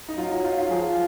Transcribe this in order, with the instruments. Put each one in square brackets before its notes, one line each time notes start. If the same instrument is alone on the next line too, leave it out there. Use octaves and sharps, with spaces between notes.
[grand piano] D#4
[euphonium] F#3 [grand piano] F4
[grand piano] D#4
F4
F4
[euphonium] F3 [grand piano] G#4